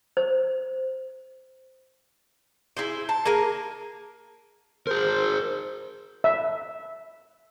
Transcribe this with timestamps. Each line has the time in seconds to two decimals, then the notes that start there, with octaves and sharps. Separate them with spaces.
0.17 C5
2.77 E4 G#4 C5
3.09 A5
3.25 A#3 G#4 A#4
4.87 G#4 A#4 C5
6.24 E5